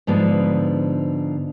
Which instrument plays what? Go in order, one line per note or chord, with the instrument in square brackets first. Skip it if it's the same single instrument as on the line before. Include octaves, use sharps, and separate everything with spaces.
[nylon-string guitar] G#2 D3 F3 B3 D4